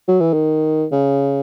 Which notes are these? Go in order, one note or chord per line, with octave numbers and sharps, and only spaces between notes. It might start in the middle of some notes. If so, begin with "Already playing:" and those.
F#3
E3
D#3
C#3